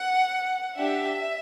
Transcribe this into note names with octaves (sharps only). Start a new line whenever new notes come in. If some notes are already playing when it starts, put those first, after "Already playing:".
Already playing: F#5
D4 G4 E5